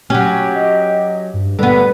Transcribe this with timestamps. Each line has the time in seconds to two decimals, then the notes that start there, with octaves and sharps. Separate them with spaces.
0.10 F#3 C#4 G4
0.55 D#5
1.34 G2
1.59 D3 G3 B3 B4